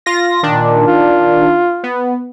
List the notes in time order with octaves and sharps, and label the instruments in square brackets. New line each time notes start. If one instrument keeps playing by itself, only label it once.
[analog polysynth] F4 A#6
[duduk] A#2 [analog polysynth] D#3 D4
[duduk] F4
[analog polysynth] B3